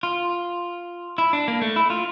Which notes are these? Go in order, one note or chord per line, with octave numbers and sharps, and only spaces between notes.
F4
E4
D4
A#3
A3
E4
F4